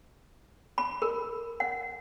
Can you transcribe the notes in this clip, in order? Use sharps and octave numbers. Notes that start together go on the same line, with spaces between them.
B5
A#4
F#5